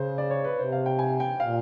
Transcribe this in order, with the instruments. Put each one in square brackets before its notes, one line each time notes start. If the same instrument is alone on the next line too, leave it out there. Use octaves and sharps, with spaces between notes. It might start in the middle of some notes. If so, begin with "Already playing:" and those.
Already playing: [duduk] C#3 [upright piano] C5
[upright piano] D5
C#5
B4
[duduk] C3 [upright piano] C5
[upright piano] F5
G5
G#5
G5
[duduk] A#2 [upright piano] F5